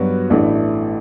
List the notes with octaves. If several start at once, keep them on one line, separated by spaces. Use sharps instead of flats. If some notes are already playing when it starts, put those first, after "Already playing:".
Already playing: G2 F#3 B3 F#4
A1 A2 E3 A3 D4